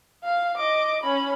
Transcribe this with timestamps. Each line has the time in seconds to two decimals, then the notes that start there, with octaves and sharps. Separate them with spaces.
0.24 F5
0.56 D#5 D6
1.03 C#4 B5